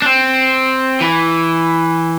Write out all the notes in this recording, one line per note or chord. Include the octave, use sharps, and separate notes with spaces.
D4
C4
E3